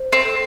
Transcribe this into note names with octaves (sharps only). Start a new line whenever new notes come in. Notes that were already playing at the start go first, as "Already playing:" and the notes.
Already playing: C5
C4
A4